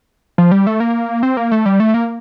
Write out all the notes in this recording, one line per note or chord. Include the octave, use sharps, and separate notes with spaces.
F3
G3
A3
A#3
C4
A#3
A3
G3
A3
A#3